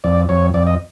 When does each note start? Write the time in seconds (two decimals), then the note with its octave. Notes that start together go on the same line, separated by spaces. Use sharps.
0.04 F2 D5
0.29 F2 C#5
0.54 F2 D5
0.67 D#5